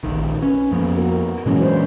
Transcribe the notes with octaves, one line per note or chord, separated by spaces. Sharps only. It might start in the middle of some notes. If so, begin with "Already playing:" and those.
A#1 D#3
C#4 B4
F2 F3 A#3 B3
F#4 A#4
A#2 E3 F#3 G#3 C#4
D4 B4 C5